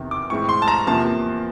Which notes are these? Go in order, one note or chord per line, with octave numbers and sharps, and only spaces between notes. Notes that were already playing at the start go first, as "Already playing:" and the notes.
Already playing: E2 C3 D#3
D6
A2 E3 G#3 C4 C#6
C6
A5
A#5
E2 C3 F3 A#3 A5